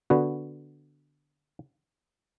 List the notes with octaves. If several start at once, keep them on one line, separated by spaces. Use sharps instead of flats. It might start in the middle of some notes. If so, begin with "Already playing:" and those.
D3 B3 F#4